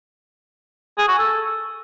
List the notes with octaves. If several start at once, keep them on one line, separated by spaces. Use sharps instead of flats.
G#4
F#4
A4